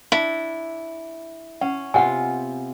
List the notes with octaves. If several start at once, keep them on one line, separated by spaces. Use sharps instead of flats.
D4 E4
C#4 F#5
C3 B3 F4 F#5 G#5